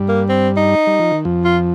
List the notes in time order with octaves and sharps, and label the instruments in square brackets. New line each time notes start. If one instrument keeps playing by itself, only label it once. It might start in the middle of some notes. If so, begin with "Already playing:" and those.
Already playing: [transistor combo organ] G2 G3
[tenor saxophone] A#3
C4
D#4
[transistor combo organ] G3
F3
D#3
F2 F3
[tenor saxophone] F4